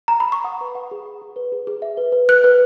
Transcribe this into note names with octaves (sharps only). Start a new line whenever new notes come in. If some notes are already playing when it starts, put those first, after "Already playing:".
A#5
B5
C#6
F#5 D#6
B4
F#5
G#4
F#5
G#4
B4
G#4
G#4
E5
B4
B4
B4 F#6
B4